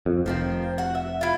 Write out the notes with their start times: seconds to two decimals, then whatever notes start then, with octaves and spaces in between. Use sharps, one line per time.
0.06 F2
0.26 F1 D#3 F3 C4
0.78 F#4 F#5
0.95 E5
1.21 E4 F4